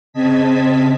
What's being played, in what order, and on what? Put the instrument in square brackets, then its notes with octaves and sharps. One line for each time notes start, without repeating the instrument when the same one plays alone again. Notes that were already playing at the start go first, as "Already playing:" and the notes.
[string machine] C#3 C4 D#5 A5 G#6 B6